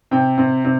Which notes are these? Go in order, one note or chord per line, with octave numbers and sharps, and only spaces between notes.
C3 G5
C3
C3